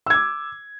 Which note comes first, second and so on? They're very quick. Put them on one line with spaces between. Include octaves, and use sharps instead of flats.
E6 G#6 D6